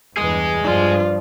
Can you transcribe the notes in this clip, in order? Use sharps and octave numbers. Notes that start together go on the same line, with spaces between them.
E2 G2 E3 G#4 D#5
G2 F3 F4 D5